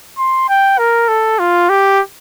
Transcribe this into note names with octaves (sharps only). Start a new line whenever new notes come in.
C6
G5
A#4
A4
F4
G4